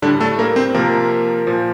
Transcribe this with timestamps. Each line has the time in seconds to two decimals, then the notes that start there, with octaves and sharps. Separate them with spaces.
0.02 A2 D3 G3 D4
0.20 A3 A4
0.39 A#3 A#4
0.56 C4 C5
0.74 C3 F3 A#3 A#4
1.47 A#2 F3